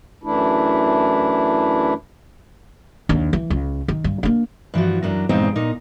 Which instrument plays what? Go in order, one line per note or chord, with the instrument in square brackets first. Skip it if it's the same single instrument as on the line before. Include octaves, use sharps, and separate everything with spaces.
[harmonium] F#2 E3 A3 D4 E4
[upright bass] D#2 D4
E3
C#2
D#3
G2
A#3 D4
[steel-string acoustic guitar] G2 E3 F3 F#4
F#2 F#3 D4 A#5
E2 G2 A#2 G#3 C4 D#4
A#2 D#4